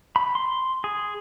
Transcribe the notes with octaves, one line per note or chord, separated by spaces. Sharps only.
B5
C6
G#4